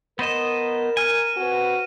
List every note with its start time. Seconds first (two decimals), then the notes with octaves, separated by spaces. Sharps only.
0.19 B3 A#4 C5 D#5 A#6 E7
0.97 G#5 F6 D#7
1.37 C4 F#4 B4